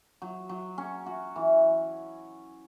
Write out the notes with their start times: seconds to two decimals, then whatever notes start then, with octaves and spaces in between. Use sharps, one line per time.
0.22 F#3
0.49 F#3
0.78 C#4
1.06 F#4
1.36 E3